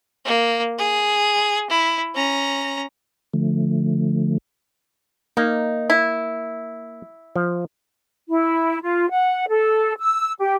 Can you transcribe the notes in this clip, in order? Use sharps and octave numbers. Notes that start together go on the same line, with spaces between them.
A#3
G#4
E4
C#4 A#5
D3 F3 A3
A#3 D#4
E4
F3
E4
F4
F#5
A4
E6
G4